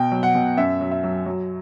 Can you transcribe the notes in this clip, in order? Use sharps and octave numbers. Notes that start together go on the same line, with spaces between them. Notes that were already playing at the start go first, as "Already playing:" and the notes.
Already playing: B2 G5
F#3
F#5
B2
F#2 E5
F#3
E5
F#3
F#3